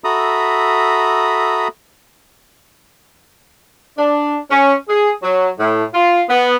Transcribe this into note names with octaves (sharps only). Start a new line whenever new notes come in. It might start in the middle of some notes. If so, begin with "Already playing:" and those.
F#4 A4 E5 A#5 B5 D#6
D4
C#4
G#4
F#3
A2
F4
B3